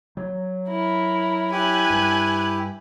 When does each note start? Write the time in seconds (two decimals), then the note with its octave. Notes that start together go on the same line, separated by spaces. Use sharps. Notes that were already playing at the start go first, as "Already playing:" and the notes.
0.17 F#3
0.67 E4 A#4
1.52 E4 G4 G#5 F#6
1.90 G2